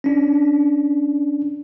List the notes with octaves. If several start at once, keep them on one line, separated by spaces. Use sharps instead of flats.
C#4 D4